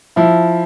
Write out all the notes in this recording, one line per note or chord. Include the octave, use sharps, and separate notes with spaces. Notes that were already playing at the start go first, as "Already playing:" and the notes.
F3 E4